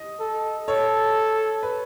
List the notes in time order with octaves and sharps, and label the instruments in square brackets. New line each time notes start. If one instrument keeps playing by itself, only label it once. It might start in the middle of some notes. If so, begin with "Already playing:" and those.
Already playing: [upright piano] D#5
[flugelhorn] A4
[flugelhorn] A4 [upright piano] C#5
[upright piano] B4